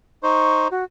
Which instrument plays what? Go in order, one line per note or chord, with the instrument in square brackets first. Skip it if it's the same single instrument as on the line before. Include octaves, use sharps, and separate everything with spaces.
[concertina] D#4 C5 [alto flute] C#6
[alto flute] F#4